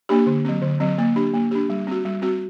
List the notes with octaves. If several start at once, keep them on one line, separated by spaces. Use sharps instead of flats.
A#3 D4 G4
D3
F#3 C4
D3
F#3 C4
A#3
D4 G4
A#3
D4 G4
G3
C4 F#4
G3
C4 F#4